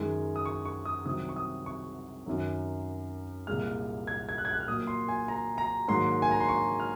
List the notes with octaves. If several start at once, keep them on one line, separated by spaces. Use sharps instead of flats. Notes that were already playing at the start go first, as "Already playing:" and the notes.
Already playing: F#2 D#3 G#3
D#6
C#6
C#6
D#6
C2 C3 D#3 F#3 C4 D#6
C#6
D#6
C#6
F#2 D#3 F#3
C2 A#2 G#3 F6
G#6
G#6
F#6
G#6
F#6
F6
A#2 F#3 A#3 D#6
C6
G#5
A#5
A#5
G#2 D#3 F#3 A#3 C6
G#5
A#5
C6
C#6
F6